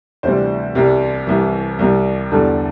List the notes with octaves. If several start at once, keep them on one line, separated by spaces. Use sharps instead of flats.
D2 C3 E3 G3 C5
C2 C3 G3
C2 C3 E3
C2 C3 G3
E2 D3 G3 A4